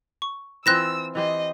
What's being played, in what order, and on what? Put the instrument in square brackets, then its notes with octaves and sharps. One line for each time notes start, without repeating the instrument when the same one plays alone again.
[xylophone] C#6
[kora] E3 C4 F4 [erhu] E6 [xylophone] F#6 A#6 E7
[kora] E3 G4 C5 [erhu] D#5